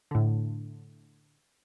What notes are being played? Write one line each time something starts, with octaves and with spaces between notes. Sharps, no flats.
A2 D3